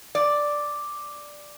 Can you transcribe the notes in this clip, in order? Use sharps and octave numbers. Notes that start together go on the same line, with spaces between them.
D5